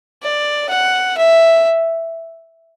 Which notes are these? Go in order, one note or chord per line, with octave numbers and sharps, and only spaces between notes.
D5
F#5
E5